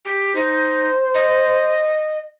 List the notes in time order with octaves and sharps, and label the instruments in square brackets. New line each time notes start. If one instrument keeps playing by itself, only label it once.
[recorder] G4
[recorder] D#4 [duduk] C5
[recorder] D#5